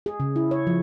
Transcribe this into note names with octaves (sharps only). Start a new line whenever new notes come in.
G#4
C#3
E4
C#5
F3